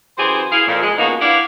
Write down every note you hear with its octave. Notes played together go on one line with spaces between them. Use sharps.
F#2 E3 G4 G#4 C5
E4 G#4 F5
F2 A#2
G#3
C#3 F3 A#3 B3 D#4 F#4
D4 E4 B4 D5 F5 F#5